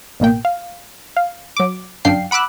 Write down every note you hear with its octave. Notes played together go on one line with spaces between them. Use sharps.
A1 B2 A#3 G5
F5
F5
F#3 D6
G1 F#2 D4 F5 G5 C7
F#5 B5 D6 E6 F#6